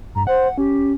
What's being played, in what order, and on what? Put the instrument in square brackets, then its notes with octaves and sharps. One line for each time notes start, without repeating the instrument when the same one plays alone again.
[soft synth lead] G2 [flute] A#5
[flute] C5 [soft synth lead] F#5
[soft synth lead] C#4 [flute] G4